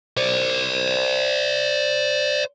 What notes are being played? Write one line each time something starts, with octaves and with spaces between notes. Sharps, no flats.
C5 D5